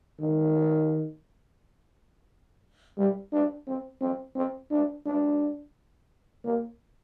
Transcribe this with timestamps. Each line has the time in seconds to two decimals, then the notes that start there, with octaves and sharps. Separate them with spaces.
0.20 D#3
2.98 G3
3.32 D4
3.67 C4
4.01 C4
4.36 C4
4.71 D4
5.06 D4
6.44 A#3